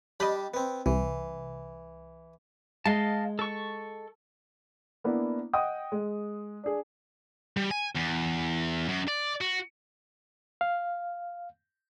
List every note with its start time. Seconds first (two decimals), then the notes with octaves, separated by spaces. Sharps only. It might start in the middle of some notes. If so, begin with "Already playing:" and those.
0.20 G3 D4 G4 D#5 B5
0.54 B3 C4
0.86 C2 E3
2.86 G#3 D#5 F5 A5
3.39 A4 C#6
5.04 A#3 B3 D4 E4
5.53 D#5 F#5 G5 D#6
5.92 G#3
6.64 D4 G#4
7.57 G3
7.71 G#5
7.95 E2
8.88 F#2
9.08 D5
9.41 F#4
10.61 F5